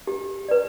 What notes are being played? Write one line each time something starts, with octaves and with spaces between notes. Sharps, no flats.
G4
B4 D5